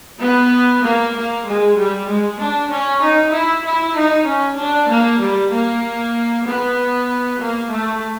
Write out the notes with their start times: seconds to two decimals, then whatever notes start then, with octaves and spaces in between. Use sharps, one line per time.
0.21 B3
0.83 A#3
1.14 A#3
1.45 G#3
1.76 G3
2.07 G#3
2.39 D4
2.70 C#4
3.01 D#4
3.32 E4
3.64 E4
3.95 D#4
4.26 C#4
4.58 D4
4.88 A#3
5.20 G3
5.51 A#3
6.45 B3
7.39 A#3
7.70 A3